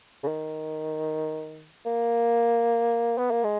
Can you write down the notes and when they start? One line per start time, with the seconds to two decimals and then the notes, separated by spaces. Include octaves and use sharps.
0.24 C#3
0.27 D#3
1.86 A#3
3.18 B3
3.31 A#3
3.44 G#3